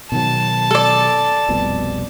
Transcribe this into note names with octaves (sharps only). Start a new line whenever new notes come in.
B2 D#3 F#3 A5
A4 D5
F1 C2 B2